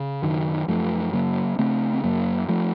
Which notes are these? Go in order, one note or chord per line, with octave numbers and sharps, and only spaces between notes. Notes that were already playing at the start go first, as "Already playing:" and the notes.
Already playing: C#3
F#2 D#3 F#3
F#2 F3 A3
C#3 F#3 A#3
C#3 A3 C4
C4
F#2 F#3 A#3
F3 A3